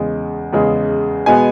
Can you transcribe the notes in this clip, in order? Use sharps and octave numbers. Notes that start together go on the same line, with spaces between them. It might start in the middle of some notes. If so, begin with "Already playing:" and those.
Already playing: E2 C#3 G#3
E2 C#3 G#3
B2 G#3 B3 G#5